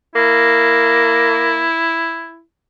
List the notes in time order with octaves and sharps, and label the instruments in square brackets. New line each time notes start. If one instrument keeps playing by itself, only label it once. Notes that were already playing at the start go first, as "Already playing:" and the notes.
[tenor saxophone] A#3 [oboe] E4